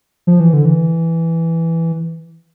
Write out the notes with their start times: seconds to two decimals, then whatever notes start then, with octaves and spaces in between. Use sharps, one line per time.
0.27 F3
0.40 E3
0.53 D3
0.65 E3